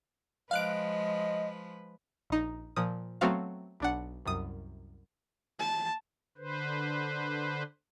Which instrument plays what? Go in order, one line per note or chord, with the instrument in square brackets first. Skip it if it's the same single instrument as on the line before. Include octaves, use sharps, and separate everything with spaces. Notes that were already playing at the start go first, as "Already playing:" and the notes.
[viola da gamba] F3 G#3 B4 [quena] D#5 [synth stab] F5 F#6 D7
[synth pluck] A#1 D#4
A#2 F3 D#6
F#3 A3 B3 C4 F#4 F5
B1 D4 F#5
C2 F#2 D#6
[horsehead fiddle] A5
[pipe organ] D3 B4 C5